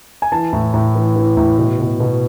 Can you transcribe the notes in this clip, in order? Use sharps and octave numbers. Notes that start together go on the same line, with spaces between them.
G#5
E3 A5
A2
A2
E3
E3
A2
B2
B2
B2